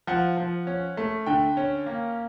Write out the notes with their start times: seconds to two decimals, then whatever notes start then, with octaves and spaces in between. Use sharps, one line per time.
0.07 F3 F#5
0.37 F3
0.67 C#4
0.97 A3
1.26 D3 G5
1.57 C#4
1.86 A#3